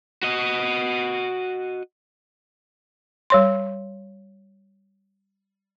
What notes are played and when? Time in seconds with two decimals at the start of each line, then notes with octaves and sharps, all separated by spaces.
0.23 F#4 D#5
3.30 G3 C#5 C6